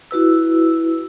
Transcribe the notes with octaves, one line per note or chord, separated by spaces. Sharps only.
E4 F#4 B4 E6